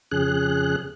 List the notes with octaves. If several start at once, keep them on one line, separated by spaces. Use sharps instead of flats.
F2 C#3 G#4 F#6